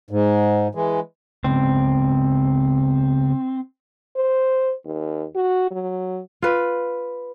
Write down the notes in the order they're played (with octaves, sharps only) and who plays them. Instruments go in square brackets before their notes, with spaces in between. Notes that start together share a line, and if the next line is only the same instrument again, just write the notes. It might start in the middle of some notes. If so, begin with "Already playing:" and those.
[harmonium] G#2
E3 G#3
[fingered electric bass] C#3 G#3 B3 [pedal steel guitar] C4
[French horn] C5
D#2
F#4
F#3
[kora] F4 B4